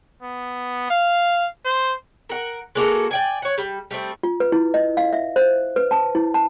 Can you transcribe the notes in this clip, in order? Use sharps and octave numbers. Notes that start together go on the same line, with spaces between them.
B3
F5
C5
A#4 F#5
G#3 A#3 F#4 A4
D5 G5 G#5
C#5 F#5
G3
G3 A3 C4
F4
B4
E4
D#5
F5
E5
C5
B4
A5
E4
A5